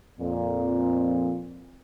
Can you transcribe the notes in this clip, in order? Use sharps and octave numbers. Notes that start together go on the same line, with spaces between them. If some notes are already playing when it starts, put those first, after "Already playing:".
F2 A#2